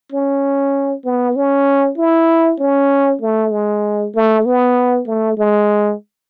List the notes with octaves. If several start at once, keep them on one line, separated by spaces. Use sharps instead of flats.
C#4
B3
C#4
E4
C#4
A3
G#3
A3
B3
A3
G#3